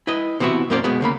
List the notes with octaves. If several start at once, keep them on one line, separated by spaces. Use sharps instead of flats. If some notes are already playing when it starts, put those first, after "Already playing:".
E4 B4 D#5
C3 E3 B3 E4 F#4
F#2 A#3 C#4 C5 D5
B1 B2 G#3 B3
D2 C#3 A#3 B5